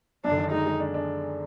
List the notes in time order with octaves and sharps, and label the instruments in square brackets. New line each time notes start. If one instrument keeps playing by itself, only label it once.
[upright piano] F#2 [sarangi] D4
[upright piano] D3
D#3
[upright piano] G#3 [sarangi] D#4
[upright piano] G#3
D4
D4